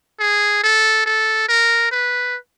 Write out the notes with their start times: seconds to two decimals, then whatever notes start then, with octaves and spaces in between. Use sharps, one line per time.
0.20 G#4
0.63 A4
1.06 A4
1.49 A#4
1.92 B4